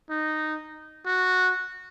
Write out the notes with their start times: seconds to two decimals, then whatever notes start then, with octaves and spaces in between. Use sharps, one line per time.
0.10 D#4
1.06 F#4